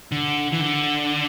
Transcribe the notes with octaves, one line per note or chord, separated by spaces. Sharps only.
D3
E3
D3